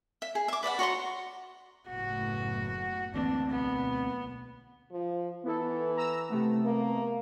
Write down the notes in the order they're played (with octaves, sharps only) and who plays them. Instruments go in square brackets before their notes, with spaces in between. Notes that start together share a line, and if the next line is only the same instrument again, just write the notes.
[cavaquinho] E5
G#4
E5 D6
B4 D5 E5 F#5
F#4 C#5 A#5 C6
[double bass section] F#1 A2 B3 [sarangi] F#4
[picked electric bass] D2 A#3 C4 [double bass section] E3 [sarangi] D4
[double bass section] B1 [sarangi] B3
[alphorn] F3
[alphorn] E3 [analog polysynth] B3 E4 A4
[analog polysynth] A#5 E6
C3 A3 B3
[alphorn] A#3